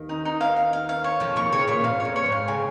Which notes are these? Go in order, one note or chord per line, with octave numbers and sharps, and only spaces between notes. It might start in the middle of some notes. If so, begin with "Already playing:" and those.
Already playing: D#2 D#3
D#4
D#4
F5
F5
F5
F5
C#5
F2 F3 F5
D#2 D#3 C#6
C#3 C#5
A#2 C#5
G#2 F5
C#5
F2
C#5
G#2
F5
C#3 G#5